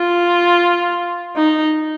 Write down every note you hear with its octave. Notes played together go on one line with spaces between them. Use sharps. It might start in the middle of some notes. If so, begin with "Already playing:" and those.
Already playing: F4
D#4